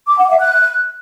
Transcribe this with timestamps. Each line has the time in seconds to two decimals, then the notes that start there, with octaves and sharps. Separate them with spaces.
0.07 D6
0.18 F#5
0.29 E5
0.40 F#6